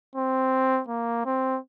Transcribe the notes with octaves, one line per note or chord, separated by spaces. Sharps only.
C4
A#3
C4